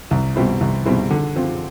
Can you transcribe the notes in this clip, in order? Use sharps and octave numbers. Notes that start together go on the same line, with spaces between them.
C2
B2 G3 C4 E4
C2
B2 G3 C4 E4
D3
F3 C4 F4